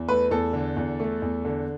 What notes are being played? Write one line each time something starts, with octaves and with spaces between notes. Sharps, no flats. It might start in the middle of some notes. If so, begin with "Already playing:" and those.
Already playing: E2
A3 B4
E2 A4
D3
E2
A3
E2
D3